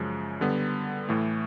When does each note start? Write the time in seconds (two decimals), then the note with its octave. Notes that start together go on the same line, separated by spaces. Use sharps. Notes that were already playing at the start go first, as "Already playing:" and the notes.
Already playing: F#2 C#3 F3 G#3
0.41 D3 G3 B3
1.09 A2 E3 A3